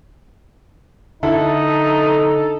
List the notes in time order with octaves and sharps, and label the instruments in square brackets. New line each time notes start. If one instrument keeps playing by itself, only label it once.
[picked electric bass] D3 [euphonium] D#4 [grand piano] E4 [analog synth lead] A4